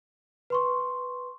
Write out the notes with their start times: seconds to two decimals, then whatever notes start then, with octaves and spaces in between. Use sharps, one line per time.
0.50 B4 C6 C#6